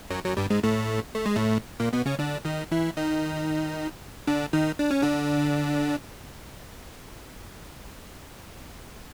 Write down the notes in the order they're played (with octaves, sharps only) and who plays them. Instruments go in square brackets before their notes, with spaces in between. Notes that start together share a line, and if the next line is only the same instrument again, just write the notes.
[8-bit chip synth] F#2 F#3
F#2 F#3
G2 G3
G#2 G#3
A2 A3
A3
G#3
A2 A3
A#2 A#3
B2 B3
C#3 C#4
D3 D4
D#3 D#4
E3 E4
D#3 D#4
D3 D4
D#3 D#4
D4
C#4
D3 D4